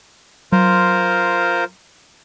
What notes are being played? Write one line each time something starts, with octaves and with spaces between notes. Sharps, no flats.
F#3 F4 A#4 C5